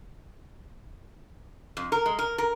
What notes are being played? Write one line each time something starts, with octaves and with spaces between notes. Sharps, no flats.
F2
A#4
G#3
A#4
A#4